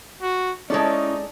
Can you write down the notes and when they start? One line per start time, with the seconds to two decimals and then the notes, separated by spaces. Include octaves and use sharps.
0.22 F#4
0.70 G#3 C#4 D#4 E4 A4 C#5 D5